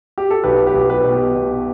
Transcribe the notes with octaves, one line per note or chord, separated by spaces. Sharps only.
G4
A4
B1 G4 B4
G4 B4
B1
G4 B4
B2
G4 B4
B2